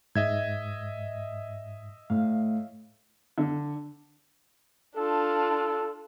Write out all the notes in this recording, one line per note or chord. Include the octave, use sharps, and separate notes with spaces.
G#2 D#5 E5 G#6
A2 F5
D3
D4 F4 A4